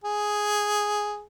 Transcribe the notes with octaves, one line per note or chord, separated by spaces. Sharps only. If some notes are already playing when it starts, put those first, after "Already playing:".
G#4